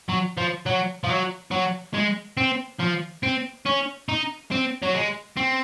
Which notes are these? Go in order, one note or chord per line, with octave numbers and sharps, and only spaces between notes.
F#3
F3
F#3
F3
F#3
F#3
G#3
C4
F3
C4
C#4
D#4
C4
F#3
G#3
C4